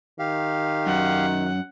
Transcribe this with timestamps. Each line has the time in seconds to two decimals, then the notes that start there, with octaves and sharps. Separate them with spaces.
0.19 D#3 G4 F5
0.87 F#2 F#5